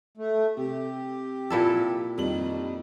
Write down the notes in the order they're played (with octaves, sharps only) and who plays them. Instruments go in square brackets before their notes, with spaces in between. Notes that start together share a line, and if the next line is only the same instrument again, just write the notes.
[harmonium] A3
[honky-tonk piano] C3 [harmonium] G4
[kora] A#2 E4 A4
[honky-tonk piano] F2 G3 F#7 [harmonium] D#3